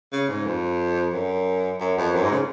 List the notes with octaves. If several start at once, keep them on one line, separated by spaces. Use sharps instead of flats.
C#3
G#2
F2
F#2
F#2
F2
F#2
G#2
C#3